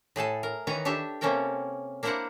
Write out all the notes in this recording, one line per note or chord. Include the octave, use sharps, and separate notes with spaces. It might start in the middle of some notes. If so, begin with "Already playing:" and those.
A2 G#4 A4 A5
A#4
D#3 E3 B4 C#5 D#5 A#5
D4 G4 A4 E5
C3 A#3 C#4 A4 A#4 G5
A#3 D4 E4 A#4 C5 F#5